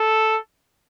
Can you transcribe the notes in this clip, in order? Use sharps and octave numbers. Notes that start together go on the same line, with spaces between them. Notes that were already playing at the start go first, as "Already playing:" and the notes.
Already playing: A4